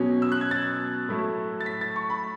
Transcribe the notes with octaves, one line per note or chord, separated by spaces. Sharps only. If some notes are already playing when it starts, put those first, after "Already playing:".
Already playing: B2 F#3 C#4
E6
F#6
G#6
A6
A2 F#3 A3 E4
A6
B6
A6
C#6
B5